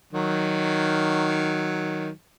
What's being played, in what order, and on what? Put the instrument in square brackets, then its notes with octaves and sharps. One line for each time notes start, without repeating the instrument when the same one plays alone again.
[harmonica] D#3 F#3